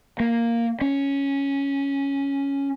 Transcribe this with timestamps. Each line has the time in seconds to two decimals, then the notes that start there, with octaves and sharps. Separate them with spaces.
0.20 A#3
0.81 C#4